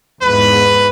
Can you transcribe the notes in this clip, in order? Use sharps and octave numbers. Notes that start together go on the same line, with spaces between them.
E2 G#2 B4